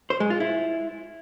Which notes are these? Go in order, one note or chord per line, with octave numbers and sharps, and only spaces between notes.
C5
G#3
F4
E4